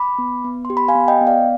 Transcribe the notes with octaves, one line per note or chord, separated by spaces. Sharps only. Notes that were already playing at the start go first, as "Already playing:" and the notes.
Already playing: B5 D6
B3
B3
C6
G4
B5
F5 G#5
B3
D#5 G5
B3
D5 F5